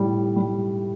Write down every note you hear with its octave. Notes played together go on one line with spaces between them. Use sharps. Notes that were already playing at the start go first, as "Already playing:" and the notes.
Already playing: A2 G3
G3